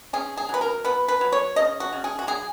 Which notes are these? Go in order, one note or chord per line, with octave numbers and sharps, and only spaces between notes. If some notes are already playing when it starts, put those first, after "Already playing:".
C#4 G#4
G#4
F#3 B4
A#4
B3 B4
B4
F#3
C#5
C#3 D#5
F#4
C#3
G#4
F#4
F#3 G#4